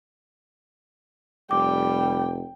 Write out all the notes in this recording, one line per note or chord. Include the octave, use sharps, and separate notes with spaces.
F1 G3 G5 D6